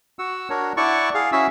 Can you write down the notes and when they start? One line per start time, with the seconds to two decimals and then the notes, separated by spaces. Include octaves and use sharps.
0.19 F#4 F#5 E6
0.50 D4 F#4 A#4 C#5
0.77 E4 D5 F#5 A5 C#6
1.14 G#4 F5
1.32 C#4 E4 F#4 G#4 E5 E6